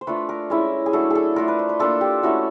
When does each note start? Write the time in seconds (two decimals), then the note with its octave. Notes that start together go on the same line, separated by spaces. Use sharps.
0.01 C5
0.07 A3 D4 F4 B4
0.29 A#4
0.50 G#3 C#4 E4
0.86 G#4
0.93 F#3 A3 D4 A4
1.10 G#4 A4
1.36 A3 D4 F4 A#4
1.48 B4
1.59 C5
1.69 B4
1.79 A#3 D4 F4 A4
2.01 G4
2.23 A3 C#4 E4 F#4